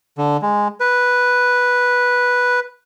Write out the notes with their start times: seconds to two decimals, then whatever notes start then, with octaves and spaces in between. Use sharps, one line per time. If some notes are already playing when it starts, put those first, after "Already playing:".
0.18 D3
0.42 G#3
0.80 B4